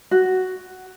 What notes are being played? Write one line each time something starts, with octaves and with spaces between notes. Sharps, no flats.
F#4